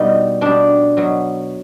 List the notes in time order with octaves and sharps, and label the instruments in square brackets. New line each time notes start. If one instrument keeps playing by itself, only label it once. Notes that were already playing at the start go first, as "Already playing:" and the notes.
Already playing: [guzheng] B2 G3 D#4
B2 G3 D4
B2 F#3